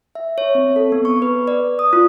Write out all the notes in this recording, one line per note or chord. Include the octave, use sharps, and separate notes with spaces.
E5
C#5
C4
A4
B3
C#6
B4
D5
D#6
F4